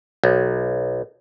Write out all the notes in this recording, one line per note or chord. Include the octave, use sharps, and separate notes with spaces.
B1